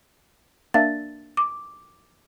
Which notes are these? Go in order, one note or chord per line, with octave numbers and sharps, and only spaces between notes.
A#3 D4 E5 A6
D6